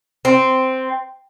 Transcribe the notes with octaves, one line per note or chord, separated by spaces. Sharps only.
C4